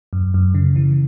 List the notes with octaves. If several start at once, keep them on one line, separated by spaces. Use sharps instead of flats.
F#2
F#2
C#3
E3